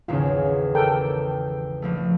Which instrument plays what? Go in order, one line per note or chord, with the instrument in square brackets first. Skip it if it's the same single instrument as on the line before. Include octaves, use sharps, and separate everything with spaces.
[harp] G#1 E2 C#3 [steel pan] C#4 F4
[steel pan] A4 A#4 G5
[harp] A#1 F3 A3